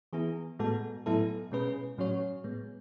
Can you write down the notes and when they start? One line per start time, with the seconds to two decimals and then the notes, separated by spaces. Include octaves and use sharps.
0.13 E3 B3 E4 G#4
0.59 A2 G#3 B3 F#4 A4
1.06 A2 F#3 B3 E4 A4
1.51 B2 G#3 C#4 G#4 B4
1.98 A2 F#3 C#4 F#4 C#5
2.44 A2 G#3 B3